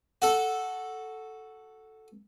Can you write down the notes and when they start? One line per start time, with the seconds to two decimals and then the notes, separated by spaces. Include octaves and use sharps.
0.22 F#4 A4